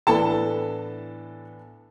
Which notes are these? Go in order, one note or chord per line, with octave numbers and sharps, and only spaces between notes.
A2 E3 B3 D4 A4 A5